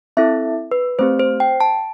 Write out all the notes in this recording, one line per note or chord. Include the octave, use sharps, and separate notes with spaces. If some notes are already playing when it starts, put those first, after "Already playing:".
C4 E4 A4 E5
B4
A3 C4 G4 C5
C5
G5
A5